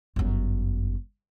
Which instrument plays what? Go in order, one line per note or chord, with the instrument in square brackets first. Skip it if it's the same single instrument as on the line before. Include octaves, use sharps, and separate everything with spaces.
[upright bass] G1 F#2